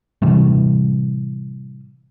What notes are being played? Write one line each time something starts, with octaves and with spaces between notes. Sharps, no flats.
A2 C3 E3 G3